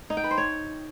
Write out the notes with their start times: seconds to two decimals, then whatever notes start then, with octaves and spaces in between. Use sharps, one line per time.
0.10 D#4
0.17 G5
0.24 B4
0.31 C5
0.38 C#5